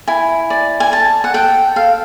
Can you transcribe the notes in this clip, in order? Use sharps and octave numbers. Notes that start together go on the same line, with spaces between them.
E4 G#5
D5
G#5
A4 A5
F#5
A4 G5
A4 F5